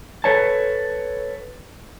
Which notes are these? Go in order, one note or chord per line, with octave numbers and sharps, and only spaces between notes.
A4 B4 C#5 A5